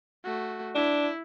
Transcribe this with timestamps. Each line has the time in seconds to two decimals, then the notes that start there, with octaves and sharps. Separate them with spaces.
0.24 A3 F#4
0.75 D4 E4